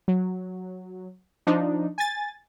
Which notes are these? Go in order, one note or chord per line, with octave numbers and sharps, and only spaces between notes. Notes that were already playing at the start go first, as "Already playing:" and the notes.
F#3
F3 D4 D#4
G#5 A6